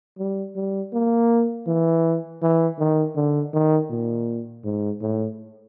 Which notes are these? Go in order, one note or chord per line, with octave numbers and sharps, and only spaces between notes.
G3
G3
A#3
E3
E3
D#3
D3
D#3
A#2
G#2
A2